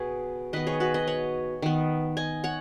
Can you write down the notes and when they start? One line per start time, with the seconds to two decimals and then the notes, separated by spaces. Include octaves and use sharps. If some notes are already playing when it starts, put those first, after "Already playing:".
Already playing: B2 B3 G#4 B4 C#5
0.53 D#3 B3 B4 D#5
0.67 G#4 C#5
0.80 F#4 B4
0.94 B4 D#5
1.07 C#5 F#5
1.62 D#3 B3
2.17 D#5 G#5
2.44 C#5 F#5